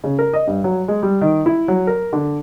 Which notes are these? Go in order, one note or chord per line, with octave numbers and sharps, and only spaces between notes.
C#3
A#4
D#5
G2
F#3
G#3
G3
D#3
E4
F#3
A#4
D3